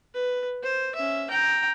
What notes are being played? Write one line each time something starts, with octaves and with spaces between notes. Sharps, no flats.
B4
C5
C#4 E5
G5 A#5